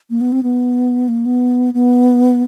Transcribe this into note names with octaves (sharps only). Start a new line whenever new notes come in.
A#3
B3
C4
B3
A#3
B3
B3